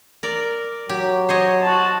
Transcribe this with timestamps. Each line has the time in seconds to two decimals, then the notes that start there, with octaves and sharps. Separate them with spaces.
0.23 A#4 D5
0.89 F#3 G4
1.29 C5 C#5 D#5
1.62 F#4 A5